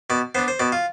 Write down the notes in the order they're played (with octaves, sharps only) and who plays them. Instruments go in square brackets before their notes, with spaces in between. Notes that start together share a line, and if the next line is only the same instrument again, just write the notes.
[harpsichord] B2 D5
B3 C5
D4
C5
B2 D5
F4